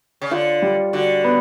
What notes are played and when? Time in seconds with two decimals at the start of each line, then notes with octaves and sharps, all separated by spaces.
0.21 C#3
0.31 D3 F4
0.62 G3
0.93 D3 F#4
1.24 B3